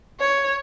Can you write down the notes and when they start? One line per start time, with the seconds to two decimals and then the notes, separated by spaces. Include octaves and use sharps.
0.20 C#5